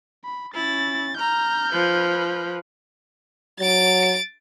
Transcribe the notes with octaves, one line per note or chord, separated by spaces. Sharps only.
B5
C#4 E4 A6
A#5 F6 G6
F3 B4
F#3 A6 D7